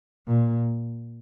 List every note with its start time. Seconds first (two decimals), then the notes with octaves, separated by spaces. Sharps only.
0.28 A#2